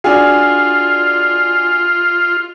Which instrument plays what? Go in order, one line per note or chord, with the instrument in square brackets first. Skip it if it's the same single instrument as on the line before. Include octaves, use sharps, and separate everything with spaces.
[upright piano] D4 F#4 G#4 [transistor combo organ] F4